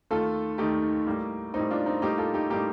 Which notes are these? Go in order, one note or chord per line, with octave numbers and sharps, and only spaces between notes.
D#2 D#3 A3 F4 A4
D#2 D#3 A3 D#4 G4
A2 G3 A#3
A2 G3 A#3 C4 D#4
D4 F4
C4 D#4
A2 G3 A#3 D#4 G4
F4 A4
D#4 G4
A2 G3 A#3 D#4 G4